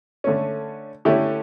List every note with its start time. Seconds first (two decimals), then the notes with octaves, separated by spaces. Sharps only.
0.24 D3 A3 C#4
1.05 D3 A3 C#4 E4 G4